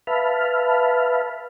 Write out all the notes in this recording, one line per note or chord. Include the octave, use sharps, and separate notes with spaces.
B4 E5 F5 A5 B5 F6